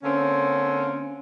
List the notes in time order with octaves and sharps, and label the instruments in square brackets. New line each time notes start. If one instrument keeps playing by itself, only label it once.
[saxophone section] D3 A#3 C4 C#4